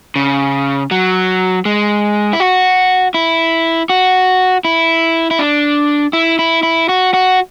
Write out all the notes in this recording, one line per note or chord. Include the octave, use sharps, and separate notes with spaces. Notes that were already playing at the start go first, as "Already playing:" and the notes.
C#3
F#3
G#3
E4
F#4
E4
F#4
E4
E4
D4
E4
E4
E4
F#4
F#4